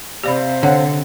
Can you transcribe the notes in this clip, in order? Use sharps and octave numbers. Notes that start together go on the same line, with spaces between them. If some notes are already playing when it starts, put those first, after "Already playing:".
C3 G4 C5 D5 F5 B5
D3 C#5 F#5